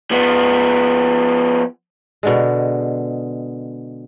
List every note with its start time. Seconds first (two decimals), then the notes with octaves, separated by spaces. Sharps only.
0.11 F3 B3
2.23 B2 D3 G#3